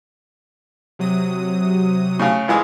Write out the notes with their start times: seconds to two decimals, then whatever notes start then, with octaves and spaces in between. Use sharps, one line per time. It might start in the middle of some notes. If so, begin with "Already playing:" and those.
0.99 C3 F#3 D#6
2.20 A2 C#3
2.48 A#1 E3 G#3